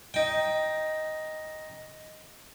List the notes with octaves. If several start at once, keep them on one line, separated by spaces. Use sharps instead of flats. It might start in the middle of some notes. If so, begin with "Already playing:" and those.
D#4 G5